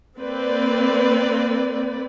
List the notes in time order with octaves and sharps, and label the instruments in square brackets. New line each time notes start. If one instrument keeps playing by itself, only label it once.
[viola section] A#3 C4 B4 D5